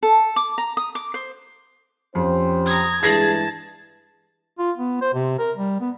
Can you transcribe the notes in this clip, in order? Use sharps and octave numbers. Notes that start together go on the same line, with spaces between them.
A4
D6
A#5
D#6
D6
C5
F2 C#4 G4 C5
A#5 D#6 G#6
G2 E3 G#3 G#4 A5 G#6 A#6 C7
F4
B3
C5
C3
A#4
G3
B3